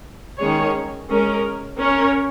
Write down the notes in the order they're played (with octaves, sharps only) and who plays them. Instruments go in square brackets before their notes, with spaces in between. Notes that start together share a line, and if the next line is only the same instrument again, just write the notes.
[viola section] D#3 G#3 C#4 G#4 C#5
G#3 C#4 A#4
C#4 A#4 C#5